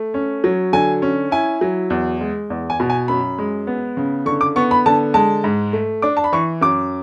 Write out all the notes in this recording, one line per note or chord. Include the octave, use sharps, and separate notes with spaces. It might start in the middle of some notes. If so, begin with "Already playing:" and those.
Already playing: A3
C#4
F#3
D3 G#5
C#4
E4 G#5
F#3
E2
G#3
E2
G#5
B2
G#5
F#2 B5
G#3
B3
C#3
D3 C#6
D6
B3 C#6
B5
D3 A5
G#3 A5
G#2
A3
D4 D6
A5
B5
E3 C#6
F#2 D6